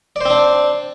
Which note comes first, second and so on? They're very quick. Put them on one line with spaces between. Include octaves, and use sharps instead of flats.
D5 C5 C4 D4